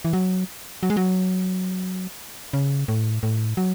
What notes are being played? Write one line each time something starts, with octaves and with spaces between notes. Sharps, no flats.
E3
F#3
F#3
G#3
F#3
C#3
A2
A2
F#3